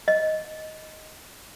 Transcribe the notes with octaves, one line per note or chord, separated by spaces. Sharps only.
D#5